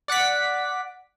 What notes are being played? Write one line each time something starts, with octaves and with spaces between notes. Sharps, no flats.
D5 F#5 D6 B6